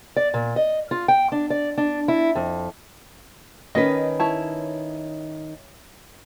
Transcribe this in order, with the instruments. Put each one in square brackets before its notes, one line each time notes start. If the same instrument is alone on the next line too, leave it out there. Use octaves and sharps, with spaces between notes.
[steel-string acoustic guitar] D5
A#2
D#5
F4
G5
D4
D5
D4
E4
F2
[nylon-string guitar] D#3 C#4 B4 [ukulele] D#5
[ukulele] E4 C#5 A5